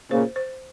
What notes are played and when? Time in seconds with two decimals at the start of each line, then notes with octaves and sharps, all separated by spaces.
0.11 A#2 C#3 C5
0.36 C5